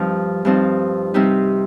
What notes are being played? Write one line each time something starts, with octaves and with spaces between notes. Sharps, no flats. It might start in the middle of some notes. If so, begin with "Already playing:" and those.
Already playing: G2 F3 C4 D#4
G2 F3 C4 D#4
C3 G3 C4 D#4 G4